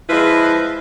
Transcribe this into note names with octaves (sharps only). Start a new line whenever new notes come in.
F3 G#3 E4 B4